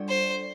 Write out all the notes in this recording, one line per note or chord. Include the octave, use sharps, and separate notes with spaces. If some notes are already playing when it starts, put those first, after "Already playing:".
Already playing: G3 D4 A4 D5
C5